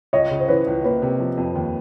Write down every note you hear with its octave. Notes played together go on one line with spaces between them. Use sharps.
C#2 C#5 D#5
C#3
C5
E3 B4 C#5
C#2
A#3 B4 C#5
C3
F3
F2
D#2